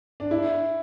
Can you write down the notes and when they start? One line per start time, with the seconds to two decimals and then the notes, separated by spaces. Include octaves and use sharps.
0.20 D4
0.31 E4